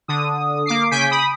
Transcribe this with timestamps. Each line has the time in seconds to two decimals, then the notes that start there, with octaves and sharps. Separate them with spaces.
0.08 D3 D#6
0.66 A#3 D6 C7
0.91 C#3 G#5 G6 B6 D7
1.11 B5 D#6